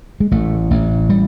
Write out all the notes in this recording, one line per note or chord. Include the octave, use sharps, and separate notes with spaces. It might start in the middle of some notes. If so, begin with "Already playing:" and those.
G#3
A1 A3
A1
G3